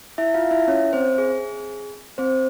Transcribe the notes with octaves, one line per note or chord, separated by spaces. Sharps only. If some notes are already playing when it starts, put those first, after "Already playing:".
E4 E5
F4 F5
E4 E5
C#4 C#5
C4 C5
G#4
C4 C5